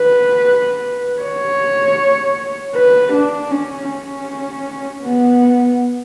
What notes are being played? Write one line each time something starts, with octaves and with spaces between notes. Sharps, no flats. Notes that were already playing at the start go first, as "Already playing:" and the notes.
Already playing: B4
C#5
B4
D4
C#4
C#4
B3